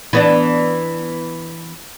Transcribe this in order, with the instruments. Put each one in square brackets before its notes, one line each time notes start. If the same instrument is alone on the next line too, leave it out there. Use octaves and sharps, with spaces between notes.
[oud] E3 B3 D4